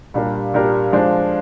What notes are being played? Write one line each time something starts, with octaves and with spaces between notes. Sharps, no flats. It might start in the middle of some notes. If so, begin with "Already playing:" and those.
A#2 G3 D4 G4 A#4
A#2 G3 D4 G4 A#4
F3 G#3 D4 F4 C5